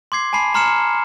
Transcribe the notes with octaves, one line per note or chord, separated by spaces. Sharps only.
C6 D6 G#6 C7
G#5 A5 B5 C7
A#5 C6 F6 C7 C#7 E7